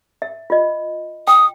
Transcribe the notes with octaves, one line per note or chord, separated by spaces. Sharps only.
E5
F4 D#5
G5 D#6